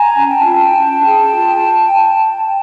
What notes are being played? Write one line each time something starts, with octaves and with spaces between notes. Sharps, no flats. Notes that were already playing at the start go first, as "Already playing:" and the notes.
Already playing: G#5 A#5
C#4
G5 A5
F4
C#4
G#4
F4